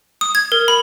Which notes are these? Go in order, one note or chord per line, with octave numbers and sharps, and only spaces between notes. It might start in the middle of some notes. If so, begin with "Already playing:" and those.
D#6
G#6
A#4
B5